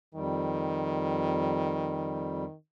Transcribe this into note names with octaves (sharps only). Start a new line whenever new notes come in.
F2 D#3 G3